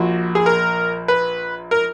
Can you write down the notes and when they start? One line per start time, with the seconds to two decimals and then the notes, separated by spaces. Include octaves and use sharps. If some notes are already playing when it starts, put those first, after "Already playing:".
Already playing: A#1 A#2 F#4
0.35 G#4
0.46 A#4
1.08 B4
1.71 A#4